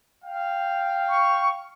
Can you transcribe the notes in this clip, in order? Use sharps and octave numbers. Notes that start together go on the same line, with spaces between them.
F5 G5
C#6